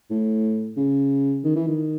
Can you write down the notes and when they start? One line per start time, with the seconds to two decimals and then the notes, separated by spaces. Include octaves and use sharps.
0.10 A2
0.77 C#3
1.44 D#3
1.56 E3
1.67 D#3